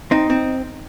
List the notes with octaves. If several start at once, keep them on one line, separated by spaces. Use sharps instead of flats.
C4 D#4
C4